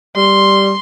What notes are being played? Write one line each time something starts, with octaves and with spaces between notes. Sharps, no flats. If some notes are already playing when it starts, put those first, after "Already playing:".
G3 C6